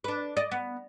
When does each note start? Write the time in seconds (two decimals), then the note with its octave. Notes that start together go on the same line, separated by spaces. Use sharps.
0.04 D4 B4
0.37 D5 D#5
0.51 B3